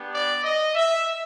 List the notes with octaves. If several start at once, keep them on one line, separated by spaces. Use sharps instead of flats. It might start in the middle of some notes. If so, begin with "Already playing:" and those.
Already playing: B3 D4 G4
D5
D#5
E5